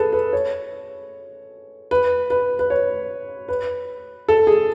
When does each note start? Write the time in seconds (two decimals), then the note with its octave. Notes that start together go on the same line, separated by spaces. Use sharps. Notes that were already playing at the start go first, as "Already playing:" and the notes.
Already playing: G#4 A4 B4
0.13 B4
0.33 C#5
1.91 B4
2.30 B4
2.59 B4
2.70 C#5
3.49 B4
4.28 A4
4.47 G#4